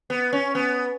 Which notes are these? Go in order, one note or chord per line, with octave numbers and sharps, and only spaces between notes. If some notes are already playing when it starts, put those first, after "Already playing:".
B3
C#4
B3